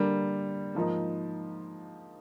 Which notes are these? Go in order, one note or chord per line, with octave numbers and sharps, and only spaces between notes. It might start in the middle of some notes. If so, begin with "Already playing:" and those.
Already playing: D3 G3 A#3
G#2 F3 A#3 D#4